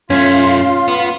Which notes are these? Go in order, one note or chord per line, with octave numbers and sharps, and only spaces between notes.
F#2 A3 C#4 F4 C6
B3